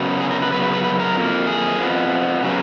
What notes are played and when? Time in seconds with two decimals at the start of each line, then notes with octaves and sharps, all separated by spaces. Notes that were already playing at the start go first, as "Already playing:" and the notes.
Already playing: F#2 C#3 F#3 B3
0.20 G#4
0.31 A#4
0.42 B4
0.52 C#3 F#3 B3 B4
0.62 B4
0.73 B4
0.84 B4
1.00 A#4
1.15 F2 F3 A#3
1.47 G#4
1.78 F2 F3 B3
2.43 C#3 F#3 B3